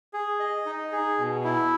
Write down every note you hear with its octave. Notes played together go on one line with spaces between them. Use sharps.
G#4
D#5
D#4
G#4
B2
E4